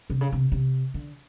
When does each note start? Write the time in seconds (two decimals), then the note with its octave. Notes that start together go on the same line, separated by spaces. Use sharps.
0.10 C3
0.21 C#3
0.32 C3
0.52 C3
0.94 D3